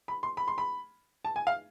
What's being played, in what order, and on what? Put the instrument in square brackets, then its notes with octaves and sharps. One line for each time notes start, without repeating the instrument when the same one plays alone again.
[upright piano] B5
C6
B5
C6
B5
A5
G#5
F5